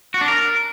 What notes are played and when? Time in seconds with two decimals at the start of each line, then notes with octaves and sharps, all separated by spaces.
0.14 F#4
0.21 D4
0.28 A#4